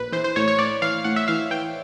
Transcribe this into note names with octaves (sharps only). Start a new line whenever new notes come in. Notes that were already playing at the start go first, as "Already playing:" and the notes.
Already playing: A#1 B4
E3 C5
C5
A2 C#5
C#5
A2 D5
E3 F5
A2 F#5
E5
E3 F5
E3 G5